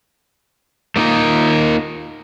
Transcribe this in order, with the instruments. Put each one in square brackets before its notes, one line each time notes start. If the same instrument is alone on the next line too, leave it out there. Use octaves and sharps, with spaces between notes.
[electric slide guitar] A3 A#3 D#4 F4 A#4